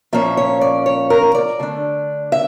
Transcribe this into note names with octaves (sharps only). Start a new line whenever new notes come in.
A#2 F3 A#3 C#4 E5
C#5
D5
C#5
A#4
D5
D3 A3 D4
E5